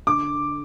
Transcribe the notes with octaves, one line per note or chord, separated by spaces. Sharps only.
D3 D6